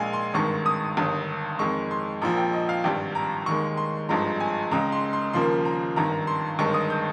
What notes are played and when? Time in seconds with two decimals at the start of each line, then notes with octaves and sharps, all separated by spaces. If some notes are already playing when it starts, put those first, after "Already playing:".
Already playing: A#1 A#2 G#3 F5 G#5
0.13 C6
0.34 G#1 G2 D#3 G#3 C#6
0.66 D#6
0.97 G1 G2 D#3
1.59 F2 D#3 G#3 C#6
1.91 C6
2.21 A#1 A#2 F3 A#5
2.37 G5
2.53 D#5
2.69 F5
2.84 G#1 G2 G3 G5
3.15 A#5
3.46 D#2 D#3 G#3 C#6
3.77 C6
4.09 G#1 G2 F3 G#3 A#5
4.40 G#5
4.71 C#2 C#3 G#3 A#5
4.92 C6
5.13 C6
5.33 D#2 C#3 F3 A#3 C6
5.65 A#5
5.96 G#1 G2 D#3 A#5
6.27 C6
6.59 G1 G2 D#3 G#3 C#6
6.74 D#6
6.90 G6